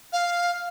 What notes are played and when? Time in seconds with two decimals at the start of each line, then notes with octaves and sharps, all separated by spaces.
0.13 F5